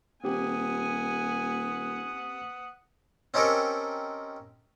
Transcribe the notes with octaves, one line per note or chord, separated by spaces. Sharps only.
D#1 C4 G4 F#5 G#5 D#6
C4 C#4 D#4 G4 A4 A#4